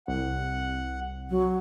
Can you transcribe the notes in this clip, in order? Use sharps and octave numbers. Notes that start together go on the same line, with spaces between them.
C2 F#5
F#3